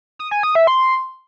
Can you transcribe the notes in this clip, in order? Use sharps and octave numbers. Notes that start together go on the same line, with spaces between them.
D#6
G#5
D#6
E5
C6